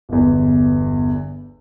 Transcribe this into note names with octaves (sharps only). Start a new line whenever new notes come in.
G1 E2